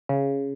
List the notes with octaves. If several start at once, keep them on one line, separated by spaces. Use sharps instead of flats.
C#3